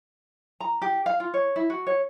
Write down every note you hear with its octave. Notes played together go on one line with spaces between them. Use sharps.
A#5
G4
F5
F4
C#5
E4
F#4
C#5